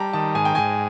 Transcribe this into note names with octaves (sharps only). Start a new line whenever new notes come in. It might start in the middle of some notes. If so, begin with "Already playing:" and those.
Already playing: G3 A5 A#5
D#3 A5
G#2 G#5
G5
G#2 G#5